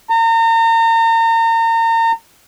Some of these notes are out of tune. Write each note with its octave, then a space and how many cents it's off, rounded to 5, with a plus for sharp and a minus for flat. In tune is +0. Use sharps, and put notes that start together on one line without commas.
A#5 -35